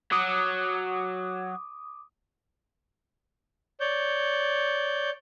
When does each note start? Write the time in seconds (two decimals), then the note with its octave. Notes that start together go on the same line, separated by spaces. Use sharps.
0.12 F#3 D6 D#6
3.80 C#5 D5 G6